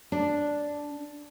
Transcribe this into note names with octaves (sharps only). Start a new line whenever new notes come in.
D4